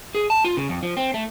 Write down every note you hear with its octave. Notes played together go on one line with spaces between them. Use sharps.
G#4
A5
F4
C#3
F2
F3
C4
A3